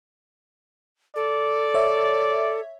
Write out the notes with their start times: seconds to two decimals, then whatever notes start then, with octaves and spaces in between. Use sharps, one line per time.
1.16 A4 D5
1.74 C#5 E5